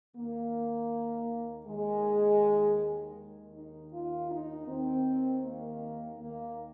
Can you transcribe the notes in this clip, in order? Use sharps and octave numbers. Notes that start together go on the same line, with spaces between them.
D#2 D#3 A#3
D#2 D#3 G#3
D#2 D#3
D#4
F4
D#4
D#2 D#3 C4
A#3
D#2 D#3 A#3